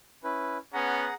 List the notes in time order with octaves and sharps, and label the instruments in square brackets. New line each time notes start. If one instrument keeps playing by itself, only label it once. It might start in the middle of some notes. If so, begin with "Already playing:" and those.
[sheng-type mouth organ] C#4 E4 B4
[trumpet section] B3 C#4 [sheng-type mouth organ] G#4 F#5 A#5